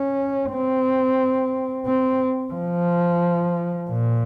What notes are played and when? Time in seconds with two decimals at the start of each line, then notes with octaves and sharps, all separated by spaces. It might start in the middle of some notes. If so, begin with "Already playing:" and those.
Already playing: C#4
0.52 C4
1.86 C4
2.54 F3
3.90 A#2